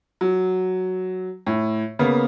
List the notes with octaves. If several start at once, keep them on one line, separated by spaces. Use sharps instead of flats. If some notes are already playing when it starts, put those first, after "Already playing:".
F#3
A2
C#3 A#3 B3